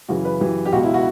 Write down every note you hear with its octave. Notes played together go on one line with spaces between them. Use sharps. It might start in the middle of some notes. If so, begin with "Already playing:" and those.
F#2 C#3 E3 F#4
B4
F#2 E3 G4
G4
C#2 B2 F#4
E4
F#4